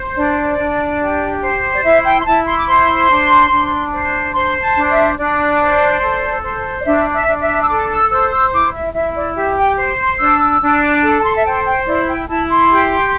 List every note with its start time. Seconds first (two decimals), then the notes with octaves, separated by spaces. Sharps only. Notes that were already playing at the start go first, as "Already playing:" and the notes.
Already playing: C5
0.17 D4 D5
0.58 D4
1.00 G4
1.42 C5
1.73 D5
1.84 E4 E5
2.04 G5
2.21 C6
2.26 E4 A5
2.46 C6
2.58 D6
2.68 C5 C6
3.09 D4
3.51 D4
3.93 C5
4.34 C5 C6
4.62 A5
4.77 D4
4.90 E5
5.18 D4 D5
5.60 C5
6.02 A4
6.43 C5
6.81 D5
6.85 D4 E5
7.13 E5
7.27 D4
7.41 E5
7.62 E6
7.69 A4 D6
7.90 E6
8.11 C5 E6
8.31 E6
8.53 E4 D6
8.73 E5
8.94 E4 E5
9.15 D5
9.35 G4 E5
9.57 G5
9.78 C5
9.98 C6
10.19 D4 E6
10.61 D4
11.03 A4
11.18 A5
11.24 C6
11.36 E5
11.45 C5 G5
11.66 G5
11.86 E4 D5
12.08 G5
12.28 E4 A5
12.49 C6
12.70 G4